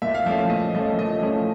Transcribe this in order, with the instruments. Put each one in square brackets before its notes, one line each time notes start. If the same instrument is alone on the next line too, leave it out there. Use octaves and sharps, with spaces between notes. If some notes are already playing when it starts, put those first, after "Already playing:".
[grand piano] A#2 E5
F5
F3 A3 C#4 E5
A#2 D#5
F3 A3 C#4 D#5
A#2 D#5
F3 A3 C#4